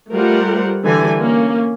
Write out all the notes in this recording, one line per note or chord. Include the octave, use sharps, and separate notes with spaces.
G3 A3 F4 A#4 C5 F#5
D3 E3 G3 G#5
A#3 C#4